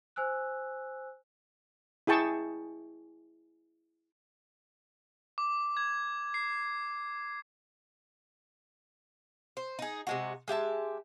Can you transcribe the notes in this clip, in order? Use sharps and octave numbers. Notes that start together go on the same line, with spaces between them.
C5 G#5 E6 F#6
E4 G#4 G5 A5 C#6
D6
G#6
C7
C5
D#4 G#4
C3 G#3 F#4
G#3 G4 E5 A5